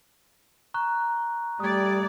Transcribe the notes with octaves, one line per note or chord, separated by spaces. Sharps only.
A#5 C#6 F#6
G3 A3 D5 D#6 G#6